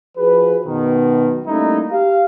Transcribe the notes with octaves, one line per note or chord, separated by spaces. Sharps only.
F3 F#4 G#4 B4
F#2 B2 D#3
G3 A3 A#3 C#4 D#4 E4
G4 F5